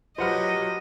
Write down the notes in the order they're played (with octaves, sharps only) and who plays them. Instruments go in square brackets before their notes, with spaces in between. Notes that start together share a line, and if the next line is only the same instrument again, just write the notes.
[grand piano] F3 B4 [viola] F#3 G4 [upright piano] C5 F#5 F6 [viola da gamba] D#5